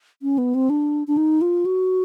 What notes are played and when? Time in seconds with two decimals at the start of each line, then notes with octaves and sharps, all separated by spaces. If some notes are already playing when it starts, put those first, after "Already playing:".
0.22 C#4
0.38 B3
0.55 C4
0.70 D4
1.07 D4
1.17 D#4
1.41 F4
1.66 F#4